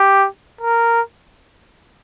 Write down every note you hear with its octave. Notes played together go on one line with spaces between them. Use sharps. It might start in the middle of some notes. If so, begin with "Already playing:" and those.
Already playing: G4
A#4